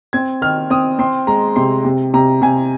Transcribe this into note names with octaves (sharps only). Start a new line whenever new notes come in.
C4 G#6
D#3 F6
C4 D#6
C4 C6
G#3 A#5
C3 C6
C3
C3 A#5
C3 G#5